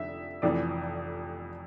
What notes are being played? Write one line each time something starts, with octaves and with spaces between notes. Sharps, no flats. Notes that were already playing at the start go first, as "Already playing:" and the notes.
Already playing: F1 F2 D3 E5
F1 F2 E3 D5